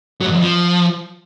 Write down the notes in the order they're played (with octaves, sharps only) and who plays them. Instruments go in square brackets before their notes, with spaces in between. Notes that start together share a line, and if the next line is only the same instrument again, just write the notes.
[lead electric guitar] F#3
G#2
E2
F2
F3